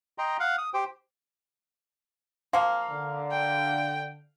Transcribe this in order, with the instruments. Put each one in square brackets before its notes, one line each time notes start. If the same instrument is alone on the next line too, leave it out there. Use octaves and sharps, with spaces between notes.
[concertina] D#5 G5 A#5 C6
F5 F#5
D#6
G4 C5 G5
[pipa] F3 A#3 [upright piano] F5
[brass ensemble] D3
[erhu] G5